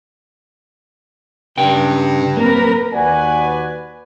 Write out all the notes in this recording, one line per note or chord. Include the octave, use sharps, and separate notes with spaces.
G2 C#3 G5
A#3 C4 A#4 B4
D#2 F#4 B4 D5 G#5